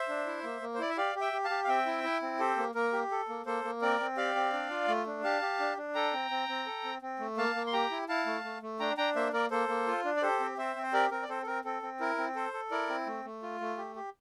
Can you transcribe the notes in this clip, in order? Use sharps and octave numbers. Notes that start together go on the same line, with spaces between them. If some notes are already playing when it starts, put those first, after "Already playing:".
Already playing: C5 E5
D4
E4
A#3
A#3
C5
E4 D5
E5
G4 D5 F5
G4
E5 G5
G4
F5 A5
G4
F5
C4 E5 G5
E4
E4
C4
G4 A4 C5
A#3
A#3 A#4
G4
A4
A#3
A#3 A4 C5
A#3
C4 A#4 D5
C4
G4 D5 F5
C4
D4
F4
A3
D4
G4 F5 A5
G4
D4
D4
A4 G5 A#5
C4
C4
C4
A4
C4
C4
A3
A#3 F5 A5
A#3
C6
G4 G5 A#5
E4
E4 F5 A5
A3
A3
A3
D4 G5 A#5
D4 G5 A#5
A#3 C5 E5
A#3 A#4 D5
A#3 A4 C5
A#3
F4
D4
D5
G4 A4 C5
C4
C4 C5 E5
C4
C5
G4 A#4 D5
C4 A#4
D5
C4 A4 C5
A4
C4 A#4
C4 A4
C4
E4 A#4
C4
A4 C5
A4
E4 A#4 D5
C4
A3
A3
F4
A3
G4
G4